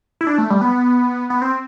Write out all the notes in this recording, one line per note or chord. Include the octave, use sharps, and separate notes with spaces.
E4
D4
A3
G3
B3
B3
C4